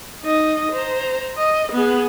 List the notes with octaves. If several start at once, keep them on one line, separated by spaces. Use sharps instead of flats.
D#4 D#5
C5 A#5
D#5
B3 G#4